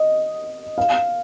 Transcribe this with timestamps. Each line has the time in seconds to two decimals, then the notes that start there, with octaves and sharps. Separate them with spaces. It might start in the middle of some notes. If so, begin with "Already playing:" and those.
Already playing: D#5
0.78 F5